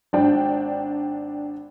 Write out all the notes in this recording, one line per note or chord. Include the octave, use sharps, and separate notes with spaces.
G#1 D4 G5